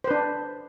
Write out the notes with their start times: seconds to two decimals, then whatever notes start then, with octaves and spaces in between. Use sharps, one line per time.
0.04 C5
0.08 B4
0.11 D4